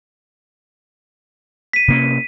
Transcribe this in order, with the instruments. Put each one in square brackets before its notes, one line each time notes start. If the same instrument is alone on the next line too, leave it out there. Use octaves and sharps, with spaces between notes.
[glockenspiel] B6 D#7
[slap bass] C3 A#3 C#4